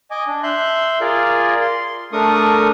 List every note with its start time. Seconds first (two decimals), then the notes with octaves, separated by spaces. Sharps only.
0.11 D#5 G#5 D6
0.27 D4
0.43 E5 C6 F#6 G6
1.01 F4 G#4 A#4 D5
1.61 C6
2.13 A3 D4 A#4 C#6 D#6